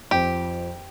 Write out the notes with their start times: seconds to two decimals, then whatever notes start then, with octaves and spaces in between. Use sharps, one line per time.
0.11 F2 F3 C4 G4